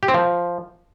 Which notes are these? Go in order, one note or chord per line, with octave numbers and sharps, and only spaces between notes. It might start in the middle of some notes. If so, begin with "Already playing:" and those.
G4
C4
F3